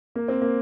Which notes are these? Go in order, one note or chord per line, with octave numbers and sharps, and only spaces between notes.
A#3
C4
A#3